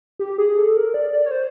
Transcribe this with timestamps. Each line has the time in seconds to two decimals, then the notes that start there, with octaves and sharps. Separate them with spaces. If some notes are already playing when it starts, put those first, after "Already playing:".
0.19 G4
0.38 G#4
0.57 A4
0.76 A#4
0.94 D5
1.13 D5
1.26 C#5
1.31 C5